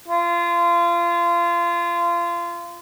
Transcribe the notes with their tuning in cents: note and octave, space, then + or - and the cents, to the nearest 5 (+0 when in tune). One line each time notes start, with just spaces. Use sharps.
F4 -25